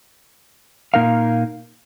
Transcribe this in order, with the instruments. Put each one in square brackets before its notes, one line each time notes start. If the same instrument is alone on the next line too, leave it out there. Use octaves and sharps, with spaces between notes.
[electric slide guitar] A#2 A#3 D#4 A#4 F5